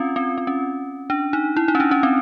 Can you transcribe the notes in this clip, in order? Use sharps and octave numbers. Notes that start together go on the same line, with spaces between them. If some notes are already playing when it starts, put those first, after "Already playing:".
Already playing: C4 C#4 F4
C4
C4
C#4
D4
D#4
E4
D#4
C#4
D4
C#4
C4